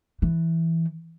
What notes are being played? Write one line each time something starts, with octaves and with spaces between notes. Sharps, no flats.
E3